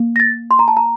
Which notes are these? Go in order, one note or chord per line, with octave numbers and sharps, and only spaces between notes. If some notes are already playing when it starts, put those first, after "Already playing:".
Already playing: A#3
A#6
A6
C6
A#5
A5
A#5